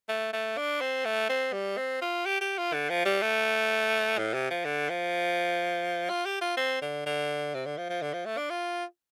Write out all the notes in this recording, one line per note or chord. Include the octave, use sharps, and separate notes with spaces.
A3
A3
D4
C4
A3
C4
G3
C4
F4
G4
G4
F4
D3
F3
G3
A3
A2
C3
F3
D3
F3
F4
G4
F4
C4
D3
D3
C3
D3
F3
F3
D3
F3
A3
D4
F4